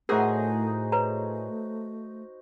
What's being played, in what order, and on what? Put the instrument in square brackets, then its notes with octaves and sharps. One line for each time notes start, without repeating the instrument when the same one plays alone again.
[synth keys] A2 G#4 [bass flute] A3 [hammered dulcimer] D#4 F#4 C5 [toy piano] A#4
[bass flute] A3 [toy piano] B4 C#5 A#5